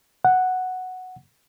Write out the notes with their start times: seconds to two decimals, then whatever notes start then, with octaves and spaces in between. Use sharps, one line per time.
0.25 F#5